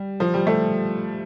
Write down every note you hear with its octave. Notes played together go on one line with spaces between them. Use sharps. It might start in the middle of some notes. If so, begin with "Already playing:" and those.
Already playing: G3
F3
G3
A3